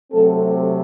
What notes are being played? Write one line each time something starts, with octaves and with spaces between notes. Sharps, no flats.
C3 F#3 A3 C4 A4